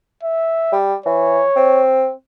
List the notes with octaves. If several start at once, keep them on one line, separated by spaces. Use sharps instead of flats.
E5
G3
E3 C#5
C4